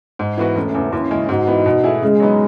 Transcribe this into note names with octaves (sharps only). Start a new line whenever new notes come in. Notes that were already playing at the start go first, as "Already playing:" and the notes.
G#2
E3 B3 F#4 B4
E1 A3 C#4
E2 C#3
D#2 C#4 E4
C#3 G#3
G#2 D#4 F#4
E3 B3
B2
A3 E4 G#4
C#3 G#3
F#3 B3 D#4